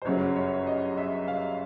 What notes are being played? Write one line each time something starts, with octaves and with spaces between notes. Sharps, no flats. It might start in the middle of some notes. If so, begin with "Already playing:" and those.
C5
G1 F#2 C#3 F#3 C#5
C#5
D#5
E5
F5